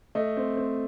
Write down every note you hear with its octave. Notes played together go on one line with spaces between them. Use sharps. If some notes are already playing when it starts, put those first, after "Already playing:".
A3 D#5
C4
C4